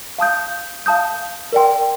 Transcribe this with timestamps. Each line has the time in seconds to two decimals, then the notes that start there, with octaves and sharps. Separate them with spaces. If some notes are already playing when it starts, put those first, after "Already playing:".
0.18 F5 A5 D#6 G6
0.86 F5 A5 D#6 G6
1.52 A#4 D5 G5 C6